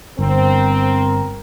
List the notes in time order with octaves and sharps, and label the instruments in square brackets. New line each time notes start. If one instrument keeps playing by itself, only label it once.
[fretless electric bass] G1 [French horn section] C4 [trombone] A#4